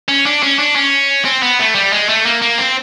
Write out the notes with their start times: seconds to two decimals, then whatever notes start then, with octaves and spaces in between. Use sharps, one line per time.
0.08 C#4
0.26 D4
0.43 C#4
0.59 D4
0.76 C#4
1.25 C4
1.42 B3
1.59 A3
1.75 G3
1.93 G#3
2.09 A3
2.26 A#3
2.42 A#3
2.58 C4